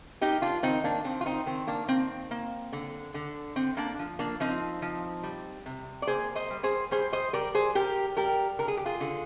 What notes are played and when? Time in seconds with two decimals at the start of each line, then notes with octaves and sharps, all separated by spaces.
0.21 A#3 D#4 G4
0.42 D4 F4
0.63 D#3 C4 D#4
0.84 A#3 D4
1.04 D#3 C4
1.21 F4
1.26 C4 D#4
1.46 D#3 C4
1.67 A#3 D4
1.88 A#3 C4
2.31 A#3
2.73 D3
3.14 D3
3.56 D3 C4
3.77 A#3 D4
3.99 F3
4.19 A#3 D4
4.40 F3 C4 D#4
4.82 F3
5.23 G3
5.66 C3
6.02 D5
6.07 A#3 G#4 C5
6.35 C5 D#5
6.50 G3
6.63 G#4 C5
6.91 G3 G#4 C5
7.13 C5 D#5
7.33 G3 A#4 D5
7.55 G#4 C5
7.75 G3 G4 A#4
8.17 G3 G4 A#4
8.59 D3 A#4
8.68 G#4
8.77 G4
8.86 F4 G#4
9.00 D3